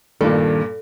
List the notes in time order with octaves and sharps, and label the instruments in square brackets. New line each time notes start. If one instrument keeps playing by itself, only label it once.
[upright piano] G2 A#2 [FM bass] D#3 [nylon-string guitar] A4